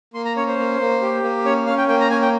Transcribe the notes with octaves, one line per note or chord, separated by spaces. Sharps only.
A#3 C6
A#5
C#4 C#5
C5
A#3
A#3
G4
A#3
C#4 C#5
C#4 F5
G5
A#3 G5
A#5
C#4 G#5
G5